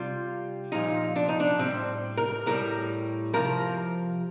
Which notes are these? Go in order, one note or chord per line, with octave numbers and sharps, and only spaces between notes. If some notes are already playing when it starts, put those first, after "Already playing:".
Already playing: C3 G3 F4
A#2 F3 D#4
D4
D#4
D4
A2 G3 C4
A#4
A2 G3 A#4
C3 F3 A#4